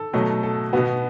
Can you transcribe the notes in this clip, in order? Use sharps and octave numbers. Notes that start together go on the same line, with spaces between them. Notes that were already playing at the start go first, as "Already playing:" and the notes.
Already playing: A4
B2 F#3 A3
A4
B2 B3 F#4